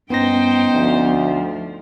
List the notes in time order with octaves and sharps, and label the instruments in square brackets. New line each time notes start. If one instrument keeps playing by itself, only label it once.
[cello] G2 G5 [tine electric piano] B3 C#4 A#6 [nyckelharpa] D#4 C5
[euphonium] D2 [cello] F3